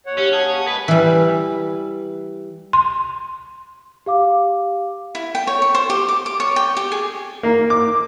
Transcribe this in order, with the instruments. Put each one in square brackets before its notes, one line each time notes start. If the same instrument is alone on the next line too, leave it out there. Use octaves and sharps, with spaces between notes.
[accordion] D#2 C#5 F#5
[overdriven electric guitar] C#4 [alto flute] G4
[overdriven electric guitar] G#4 [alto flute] A5
[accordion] D2 G#3 [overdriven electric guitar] B4
[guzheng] E3 G3
[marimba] C6
[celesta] G4 F5 D6
[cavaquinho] E4
G5
C#5
C#6
C5
G4
D6
D6
C#5
G5
G4
G#4
[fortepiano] A#3
D6